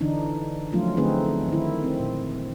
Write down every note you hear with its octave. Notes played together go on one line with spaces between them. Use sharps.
D3 E3 D4 D#4
F3 F#3 A3 C#4 F4
D3 A3 C4 D#4 G#4 B4
D#3 E4
C4
A#2